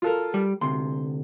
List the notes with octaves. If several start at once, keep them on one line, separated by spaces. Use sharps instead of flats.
F4 A4 A#4
G3
D2 C3 C6